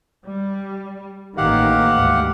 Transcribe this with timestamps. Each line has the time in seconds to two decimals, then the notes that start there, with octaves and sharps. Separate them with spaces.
0.23 G3
1.37 A1 D#3 A#3 G4 F5 F#5
1.92 D2 G#2